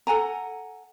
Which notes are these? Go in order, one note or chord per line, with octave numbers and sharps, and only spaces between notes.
A4 F#5 G#5 A#5